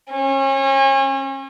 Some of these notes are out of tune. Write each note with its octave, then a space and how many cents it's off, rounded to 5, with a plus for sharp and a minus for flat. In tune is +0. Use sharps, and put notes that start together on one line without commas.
C#4 -35